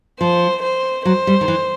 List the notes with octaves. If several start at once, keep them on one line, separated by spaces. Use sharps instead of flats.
F3 C5
C5
F#3 C5
G3
D#3
E3